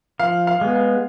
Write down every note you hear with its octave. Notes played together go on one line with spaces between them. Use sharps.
F3 F5
F5
G#3 B3
F5